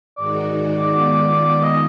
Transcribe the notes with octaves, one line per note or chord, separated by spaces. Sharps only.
G#2 D#3 G#3 D#4 F#4 D5
D#3 G#3 B3 F4
D#5